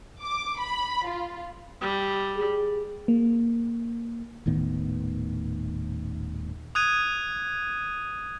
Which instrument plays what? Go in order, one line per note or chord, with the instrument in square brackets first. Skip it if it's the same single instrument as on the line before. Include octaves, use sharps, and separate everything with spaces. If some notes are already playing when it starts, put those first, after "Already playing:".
[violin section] D6
B5
F4
[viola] G3
[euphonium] G#4
[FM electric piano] A#3
[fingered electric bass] D#1 A2 D#3 B3
[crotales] D#6 F#6 G#6 D#7